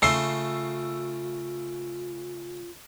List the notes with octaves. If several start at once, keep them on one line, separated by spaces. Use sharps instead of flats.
C#3 A3 F4 C6 E6 C7